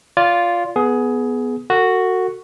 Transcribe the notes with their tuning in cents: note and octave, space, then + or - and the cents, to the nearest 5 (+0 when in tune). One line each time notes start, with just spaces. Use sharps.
F4 +0 D5 -25
B3 +0 G#4 +15
F#4 +0 A4 +45